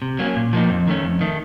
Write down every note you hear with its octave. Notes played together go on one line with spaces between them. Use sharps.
C3
F#3 A#3 C#4
A#2
F3 A#3 D#4
F2
D#3 A3 C#4
F2
D#3 A3